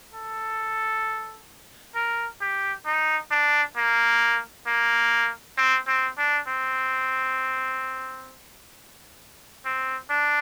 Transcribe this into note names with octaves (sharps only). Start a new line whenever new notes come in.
A4
A#4
G4
D#4
D4
A#3
A#3
C4
C4
D4
C4
C4
D4